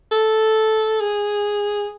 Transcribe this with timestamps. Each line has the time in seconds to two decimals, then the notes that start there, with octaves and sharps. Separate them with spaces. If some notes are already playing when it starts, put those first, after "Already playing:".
0.12 A4
1.00 G#4